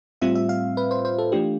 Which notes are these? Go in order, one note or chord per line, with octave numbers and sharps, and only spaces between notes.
A2 G3 C4 F4 E5
E5
F5
B4
C5
C5
A4
E3 A3 D4 F4 G4